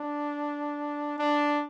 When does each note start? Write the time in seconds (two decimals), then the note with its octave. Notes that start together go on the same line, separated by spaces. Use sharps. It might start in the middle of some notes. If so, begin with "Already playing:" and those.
Already playing: D4
1.19 D4